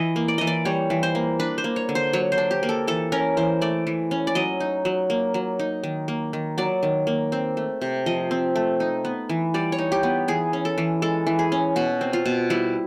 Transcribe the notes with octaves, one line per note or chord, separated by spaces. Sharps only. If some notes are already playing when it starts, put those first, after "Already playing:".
Already playing: E3 D#5
A#3
D5
E3 D#5
D5
G3 C#5
E3
C5
A#3
D4 B4
C5
A#3
C#5
D3
C5
F#3 C#5
C5
D4
G4
A#3
A4
E3 A4
C#4 A#4
E3 C5
A3 D5
E3
C#4
D5
F#3 D#5
D#4
F#3
A#3
F#3
D#4
D#3
A#3
D#3
F#3 D5
D#3
A#3
C4
A3
C3
F3 D#5
C4
A3
D#4
B3
E3
G3 D5
C#5
D#4
G4
B3
E3 G#4
C#4
A4
E3
G#3 A4
E3
G#4
C#4
B2 F#4
C4
F4
B2
G3 E4